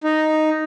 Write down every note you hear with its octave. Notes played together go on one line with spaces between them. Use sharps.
D#4